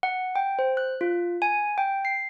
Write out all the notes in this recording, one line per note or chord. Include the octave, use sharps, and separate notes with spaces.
F#5
G5
C5
F#6
F4
G#5
G5
C7